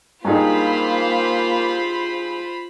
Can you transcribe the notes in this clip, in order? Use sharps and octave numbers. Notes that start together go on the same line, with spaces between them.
G2 G#3 A#3 D#4 F4 C5 B5